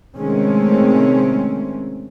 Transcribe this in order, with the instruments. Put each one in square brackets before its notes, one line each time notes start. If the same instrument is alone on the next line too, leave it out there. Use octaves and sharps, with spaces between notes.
[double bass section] C3 D#3 G#3 A3 C4 C#4